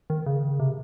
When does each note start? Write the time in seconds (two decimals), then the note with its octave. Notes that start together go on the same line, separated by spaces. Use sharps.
0.10 D#3
0.26 C#3
0.59 C3